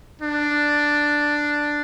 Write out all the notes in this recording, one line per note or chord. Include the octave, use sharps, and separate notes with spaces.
D4